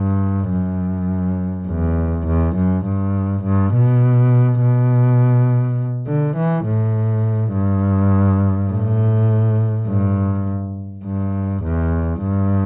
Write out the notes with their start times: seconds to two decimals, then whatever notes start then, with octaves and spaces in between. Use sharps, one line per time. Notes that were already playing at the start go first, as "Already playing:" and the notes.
Already playing: G2
0.51 F#2
1.68 E2
2.27 E2
2.55 F#2
2.85 G2
3.44 G2
3.73 B2
4.61 B2
6.07 D3
6.36 E3
6.66 A2
7.54 G2
8.71 A2
9.88 G2
11.04 G2
11.63 E2
12.22 G2